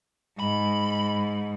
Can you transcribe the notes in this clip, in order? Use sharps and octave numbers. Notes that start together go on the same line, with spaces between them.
G#2 B5